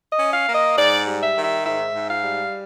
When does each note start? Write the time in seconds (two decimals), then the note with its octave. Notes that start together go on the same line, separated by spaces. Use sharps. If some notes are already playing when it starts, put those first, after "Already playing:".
0.11 D#5
0.18 C#4
0.32 F5
0.47 A#3
0.54 D#5
0.76 G#2 D5
1.06 G3
1.21 E5
1.35 D#3
1.43 E5
1.64 G#2 E5
1.94 G#2
2.08 F5
2.23 G3